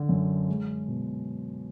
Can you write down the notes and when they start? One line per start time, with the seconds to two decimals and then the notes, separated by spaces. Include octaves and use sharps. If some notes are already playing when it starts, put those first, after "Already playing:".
Already playing: D3
0.09 F#2
0.48 G#3
0.88 B2